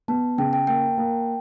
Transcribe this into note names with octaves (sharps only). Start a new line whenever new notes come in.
B3 A5
C#3 G5
G5
A#3 G5
A#3